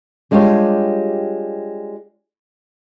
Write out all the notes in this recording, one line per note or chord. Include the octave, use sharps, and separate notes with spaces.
G3 G#3 D4 F4 G4 C#5